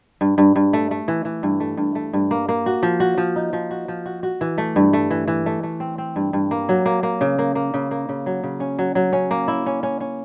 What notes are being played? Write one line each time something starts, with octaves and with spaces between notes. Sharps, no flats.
G2
G2
G2
A3
A3
E3
E3
G2
A3
G2
A3
G2
A#3
A#3
F#4
F3
F#4
F3
D#4
F3
F#4
F3
F#4
F#4
E3
A3
G2
A3
E3
E3
A3
A3
C4
C4
G2
G2
A#3
F#3
A#3
A#3
C#3
A#3
A#3
C#3
A#3
C#3
F#3
C#3
C#4
F#3
F#3
C#4
A#3
E4
C#4
C#4
C#4